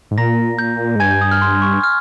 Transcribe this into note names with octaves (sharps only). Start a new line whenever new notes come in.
G#2
A#2 A#5 A#6
G6
G#2
G2 G#5 G#6
G6
D#6
F6
C6
C#6
F6